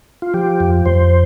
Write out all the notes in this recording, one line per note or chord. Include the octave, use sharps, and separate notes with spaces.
F4
F3 G4
F2
F2 C5